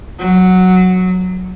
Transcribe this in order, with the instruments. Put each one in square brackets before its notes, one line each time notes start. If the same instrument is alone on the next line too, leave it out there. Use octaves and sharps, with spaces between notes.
[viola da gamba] F#3